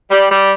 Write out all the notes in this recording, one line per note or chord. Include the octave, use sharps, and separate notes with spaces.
G3
G3